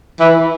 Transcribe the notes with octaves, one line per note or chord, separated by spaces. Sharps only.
E3